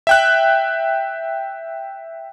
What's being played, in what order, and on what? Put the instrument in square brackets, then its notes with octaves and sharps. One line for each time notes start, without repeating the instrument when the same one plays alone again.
[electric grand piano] E5 G5 F#6